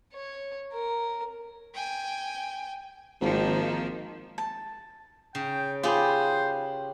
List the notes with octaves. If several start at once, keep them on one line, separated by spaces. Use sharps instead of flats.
C#5
A#4
G5 G#5
G#1 D#3 F3 A#3
A5
C#3 G5
F4 G4 G#4 B4 C5